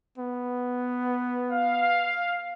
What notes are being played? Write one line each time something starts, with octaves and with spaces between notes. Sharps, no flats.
B3
F5